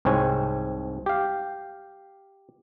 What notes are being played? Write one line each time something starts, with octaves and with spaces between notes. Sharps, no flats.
C2 G#2 C4 C#5 G#5
G4 F5